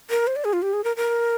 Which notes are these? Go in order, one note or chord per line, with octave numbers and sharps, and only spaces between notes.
A#4
C5
D5
G#4
F4
G4
G#4
A#4
A#4